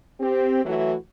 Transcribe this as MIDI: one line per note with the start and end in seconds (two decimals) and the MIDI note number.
0.21 0.64 60
0.21 0.64 67
0.65 0.95 52
0.65 0.95 54
0.65 0.95 57
0.65 0.95 64
0.65 0.95 66